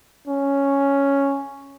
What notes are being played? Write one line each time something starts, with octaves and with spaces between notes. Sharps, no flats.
C#4